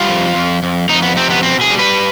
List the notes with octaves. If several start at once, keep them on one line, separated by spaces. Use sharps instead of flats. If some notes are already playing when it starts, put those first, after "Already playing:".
Already playing: G3 F4
F2
F2
F2
F2 D#4
B3
C3 C4
B3
B2 C4
G#4
G3
B4